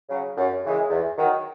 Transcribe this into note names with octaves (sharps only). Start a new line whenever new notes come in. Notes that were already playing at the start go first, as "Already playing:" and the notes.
C#3 F#3
F#2
C#3 E3 G#3
E2
D#3 F#3